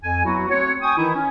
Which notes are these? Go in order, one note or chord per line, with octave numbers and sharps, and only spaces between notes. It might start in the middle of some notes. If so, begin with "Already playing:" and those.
F2 G#5
F#3 B3 E4 F#4
A3 C4 F#4 C#5
G5 G#5 C#6 D#6
D#3 E3 D#4 E4
C#4